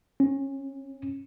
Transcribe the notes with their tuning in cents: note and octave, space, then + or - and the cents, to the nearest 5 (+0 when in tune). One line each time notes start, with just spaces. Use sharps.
C#4 -20